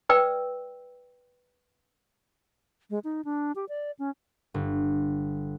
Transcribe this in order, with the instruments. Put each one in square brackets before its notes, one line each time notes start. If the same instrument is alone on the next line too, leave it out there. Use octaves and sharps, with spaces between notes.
[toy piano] B4 D5 G5 E6
[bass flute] G#3
D#4
D4
G4
D5
C#4
[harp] G1